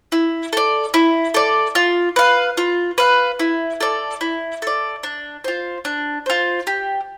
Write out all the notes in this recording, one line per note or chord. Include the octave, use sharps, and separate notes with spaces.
E4
A4 D5
E4
A4 D5
F4
B4 F5
F4
B4 F5
E4
A4 D5
E4
A4 D5
D4
F4 C5
D4
F4 C5
G4